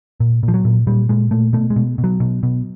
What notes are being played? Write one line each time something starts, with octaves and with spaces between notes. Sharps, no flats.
A#2
A#2
F3
F#3
A#2
A#2 G3
A#2 G#3
A#2 A3
B2 A3
G#3
B2
B2
F#3
B2
B2